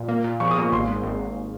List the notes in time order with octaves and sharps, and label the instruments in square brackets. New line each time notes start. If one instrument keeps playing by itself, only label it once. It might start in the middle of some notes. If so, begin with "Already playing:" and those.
Already playing: [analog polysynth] A#2
A#3
A#2
[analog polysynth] F3 [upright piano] C#6
[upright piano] D#6
[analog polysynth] A#3
[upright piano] C#6
[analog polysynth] G#1 [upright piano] C6
[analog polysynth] G#2
G#1
G#1